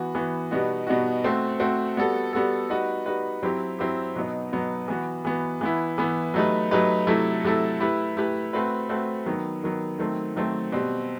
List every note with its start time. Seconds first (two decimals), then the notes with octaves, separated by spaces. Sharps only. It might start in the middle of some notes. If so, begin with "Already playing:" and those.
Already playing: E3 B3 F#4
0.15 E3 B3 F#4
0.51 B2 G3 B3 D#4 F#4
0.87 B2 G3 B3 D#4 F#4
1.24 A3 C4 F#4
1.60 A3 C4 F#4
1.97 G3 B3 F#4 A4
2.33 G3 B3 F#4 A4
2.70 G3 D#4 F#4 B4
3.06 G3 D#4 F#4 B4
3.43 F#3 C4 E4 G4
3.79 F#3 C4 E4 G4
4.15 B2 F#3 B3 D#4
4.52 B2 F#3 B3 D#4
4.88 E3 B3 F#4
5.25 E3 B3 F#4
5.61 E3 B3 E4
5.98 E3 B3 E4
6.34 F#3 A3 D#4 G4 B4
6.71 F#3 A3 D#4 G4 B4
7.07 C3 F#3 A3 E4 A4
7.44 C3 F#3 A3 E4 A4
7.80 A3 E4 G4 B4
8.17 A3 E4 G4 B4
8.53 A3 C4 F#4 B4
8.89 A3 C4 F#4 B4
9.26 D#3 F#3 B3
9.63 D#3 F#3 B3
9.99 D#3 F#3 A3 C4
10.36 D#3 F#3 A3 C4
10.72 B2 G3 C4